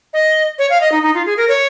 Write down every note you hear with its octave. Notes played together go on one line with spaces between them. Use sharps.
D#5
C#5
F5
D#5
D#4
D#4
F4
G#4
A#4
C#5